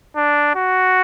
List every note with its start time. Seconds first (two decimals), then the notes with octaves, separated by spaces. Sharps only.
0.16 D4
0.56 F#4